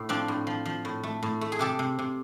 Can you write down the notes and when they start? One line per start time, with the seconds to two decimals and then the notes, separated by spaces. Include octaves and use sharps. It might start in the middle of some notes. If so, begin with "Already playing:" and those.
Already playing: A2
0.09 F3 C4 D4
0.28 A2
0.47 F3
0.65 F3
0.85 A2
1.03 A3
1.23 A2
1.41 A3
1.52 G#4
1.59 C3 G4 A4
1.79 C3
1.99 C3